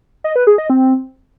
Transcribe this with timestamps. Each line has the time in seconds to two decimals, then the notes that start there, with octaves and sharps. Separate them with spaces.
0.24 D#5
0.36 B4
0.47 G#4
0.58 D#5
0.70 C4